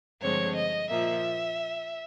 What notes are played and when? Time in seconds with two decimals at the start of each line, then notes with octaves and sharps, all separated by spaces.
0.21 G2 D3 F3 G#3 C4 C#5
0.56 D#5
0.90 A#2 F3 A#3 E5